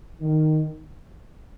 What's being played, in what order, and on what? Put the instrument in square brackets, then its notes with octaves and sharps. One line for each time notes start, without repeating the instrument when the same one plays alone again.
[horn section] D#3